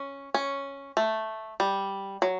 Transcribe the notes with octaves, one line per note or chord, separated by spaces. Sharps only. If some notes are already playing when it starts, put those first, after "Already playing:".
Already playing: C#4
C#4
A3
G3
F#3